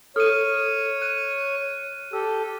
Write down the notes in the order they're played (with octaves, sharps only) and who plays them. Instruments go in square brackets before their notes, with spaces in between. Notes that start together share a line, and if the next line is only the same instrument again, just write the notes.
[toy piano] A4 [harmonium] C#5 [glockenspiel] F6 D#7
[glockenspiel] F#6 D#7
[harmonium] G4 A4 [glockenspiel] E6